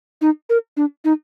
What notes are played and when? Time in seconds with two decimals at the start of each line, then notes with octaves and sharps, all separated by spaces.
0.21 D#4
0.49 A#4
0.77 D4
1.05 D#4